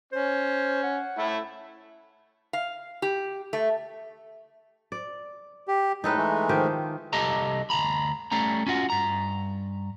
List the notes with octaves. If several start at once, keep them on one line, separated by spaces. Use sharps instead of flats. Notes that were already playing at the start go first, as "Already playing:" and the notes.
C#4 C5
F#5
A3 E4
F5
G4
A3
D5
G4
A2 G#3 D#4 A4 B4
E3 G#3 A3
D#3 F3 G4
C2 G4 A4 D#5 A5 A#5
D2 G2 A#5 B5
G3 A3 C#4 A#5
C#4 F4 F#4
G2 A#5